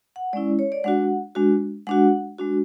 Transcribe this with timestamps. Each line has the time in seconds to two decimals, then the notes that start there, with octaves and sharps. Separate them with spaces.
0.16 F#5
0.33 G#3 C#4 E4 D5
0.59 C#5
0.72 D5
0.84 G#3 D4 F#4 F#5
1.35 G#3 D4 F#4
1.87 G#3 D4 F#4 F#5
2.38 G#3 D4 F#4